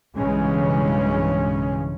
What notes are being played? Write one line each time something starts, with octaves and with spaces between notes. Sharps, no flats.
B1 G2 C#3 E3 G#3 C#4